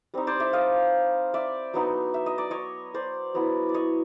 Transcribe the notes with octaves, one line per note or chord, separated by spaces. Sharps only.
G3 C4 D#4
C5 D5
D5 E5
D#5 F5
D5 E5
F#3 B3 D#4
E5
D#5
D5
C#5 D#5
C5 D5
F#3 B3 E4
D5
C#5 D#5